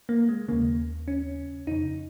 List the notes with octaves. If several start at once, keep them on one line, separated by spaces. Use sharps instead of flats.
A#3
G#3
D#2 C#3 A#3
C#4
F2 C#3 D#4